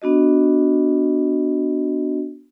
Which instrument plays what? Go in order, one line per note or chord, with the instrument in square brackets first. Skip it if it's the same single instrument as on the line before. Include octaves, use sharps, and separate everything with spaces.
[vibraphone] B3 D4 F#4 D#5